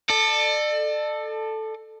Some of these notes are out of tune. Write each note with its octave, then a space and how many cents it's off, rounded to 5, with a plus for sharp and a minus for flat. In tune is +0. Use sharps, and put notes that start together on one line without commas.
A4 +0 D5 +40